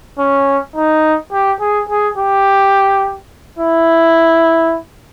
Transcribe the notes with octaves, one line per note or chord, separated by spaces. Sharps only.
C#4
D#4
G4
G#4
G#4
G4
E4